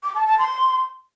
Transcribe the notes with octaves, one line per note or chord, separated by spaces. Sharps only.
D6
A5
A5
C6